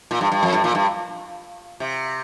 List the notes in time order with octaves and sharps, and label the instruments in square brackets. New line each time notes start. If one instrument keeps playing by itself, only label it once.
[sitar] A#2
G2
G2
F2
G2
A#2
G2
C3